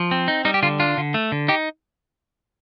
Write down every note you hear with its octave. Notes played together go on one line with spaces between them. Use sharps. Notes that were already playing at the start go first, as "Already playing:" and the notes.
Already playing: F3
C4
D#4
G3 D#4
G4
D3 F4
D4 F4
D3
A3
D3
D#4 G4